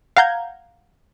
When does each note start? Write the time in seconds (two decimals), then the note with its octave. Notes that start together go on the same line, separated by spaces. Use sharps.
0.17 F5 F#5 A#5 G6 G#6